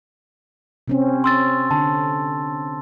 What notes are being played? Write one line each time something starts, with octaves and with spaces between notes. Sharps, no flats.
C3 C4 C#4
C6 E6 A6
D3 A5